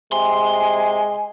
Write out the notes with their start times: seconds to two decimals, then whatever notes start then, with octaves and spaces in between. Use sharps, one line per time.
0.12 C3 G#3 G#5 C6